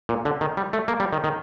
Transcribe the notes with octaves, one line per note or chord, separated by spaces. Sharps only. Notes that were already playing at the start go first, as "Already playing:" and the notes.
A#2
D3
D#3
G3
A3
A#3
G3
D#3
D#3